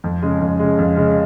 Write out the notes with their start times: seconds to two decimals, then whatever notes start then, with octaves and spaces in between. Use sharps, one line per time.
0.04 F2
0.22 C#3 G#3
0.41 F2
0.59 C#3 G#3
0.78 F2
0.96 C#3 G#3